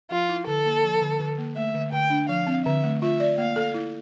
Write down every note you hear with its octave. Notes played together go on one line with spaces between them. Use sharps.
F3 F4
E4
D3 A4
A#3
F3
D3
D3
A#3
A3 E5
D3
D3 G5
D4
F3 F5
C4
D3 E5
A3
F4 E5
D5
A#3 F5
A4
E4